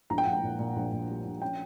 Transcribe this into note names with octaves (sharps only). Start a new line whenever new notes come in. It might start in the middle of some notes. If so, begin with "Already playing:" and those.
A#1 A#5
G5
A#1 F#5
G5
A#2
A#2
A#1
A#2
G3
A#1
C#4 G5